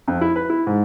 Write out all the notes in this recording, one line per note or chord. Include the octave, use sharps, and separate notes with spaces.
F2
E4
B4
E4
G#2